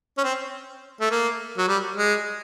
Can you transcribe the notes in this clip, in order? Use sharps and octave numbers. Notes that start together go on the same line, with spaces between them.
C#4
C4
A3
A#3
F#3
G3
G#3